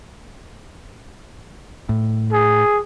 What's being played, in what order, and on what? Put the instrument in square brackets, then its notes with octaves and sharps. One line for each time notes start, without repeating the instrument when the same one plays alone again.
[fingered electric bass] A2
[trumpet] G#4